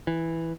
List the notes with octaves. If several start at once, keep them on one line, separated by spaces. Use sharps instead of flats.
E3